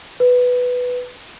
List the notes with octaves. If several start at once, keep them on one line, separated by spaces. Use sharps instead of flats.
B4